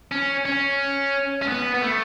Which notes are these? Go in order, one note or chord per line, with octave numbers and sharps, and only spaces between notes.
C#4
C#4
C#4
B3
B3
A3